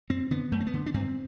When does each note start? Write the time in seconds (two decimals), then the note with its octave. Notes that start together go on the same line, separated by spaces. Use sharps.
0.10 F#2 C4
0.31 D3 B3
0.52 F#2 A3
0.60 C4
0.67 B3
0.73 D3
0.86 D4
0.94 G2 C4